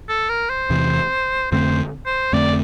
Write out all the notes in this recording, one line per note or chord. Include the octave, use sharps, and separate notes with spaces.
A4
A#4
C5
E2 C3 E3
F2 D3 A3 C4 C5
C5
F2 D3 A3 C4 D5